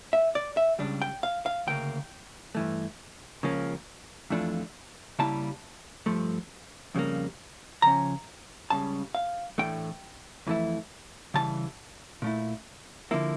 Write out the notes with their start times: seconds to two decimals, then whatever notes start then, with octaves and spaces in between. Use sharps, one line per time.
0.13 E5
0.35 D5
0.57 E5
0.79 C#2 C#3 G3 D4
1.02 G5
1.23 F5
1.46 F5
1.67 D2 C#3 A#3 G5
2.55 G2 E3 A3
3.43 C#2 C#3 F3 A#3 C#4
4.30 F2 E3 A3 D4 F4
5.19 C#3 G3 A#3 E4 A5
6.06 G2 F3 A3
6.95 F2 C#3 G3 A#3
7.82 C#3 F3 C#4 A#5
8.70 C#2 C#3 G3 A5
9.15 F5
9.58 A2 E3 A3 D4 G5
10.47 F2 E3 A3 E4
11.34 C#3 E3 G3 A5
12.22 A#2 A3 E4
13.11 D3 F3 A#3 E4